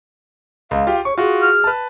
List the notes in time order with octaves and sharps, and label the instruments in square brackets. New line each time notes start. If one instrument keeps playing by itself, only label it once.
[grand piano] C#2 [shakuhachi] F5
[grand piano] F4 G4
[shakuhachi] C#5 [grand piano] C#6
[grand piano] F4 F#4 [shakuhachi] G#4
[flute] F6
[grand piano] B4 A5